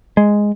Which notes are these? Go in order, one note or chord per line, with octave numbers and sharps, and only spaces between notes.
G#3